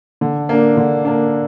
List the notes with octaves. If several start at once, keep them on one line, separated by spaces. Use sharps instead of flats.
D3
A#3 D4
D3
A#3 D4